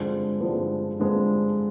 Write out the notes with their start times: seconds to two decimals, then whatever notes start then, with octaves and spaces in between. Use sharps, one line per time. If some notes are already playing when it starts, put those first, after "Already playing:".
Already playing: G2 D3 F3 G#3 C4
0.41 G2 D3 F3 G#3 C4
0.99 G2 D3 F3 G#3 C4